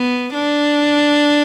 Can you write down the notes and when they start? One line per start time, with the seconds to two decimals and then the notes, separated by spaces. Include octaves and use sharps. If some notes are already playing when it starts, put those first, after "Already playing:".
Already playing: B3
0.34 D4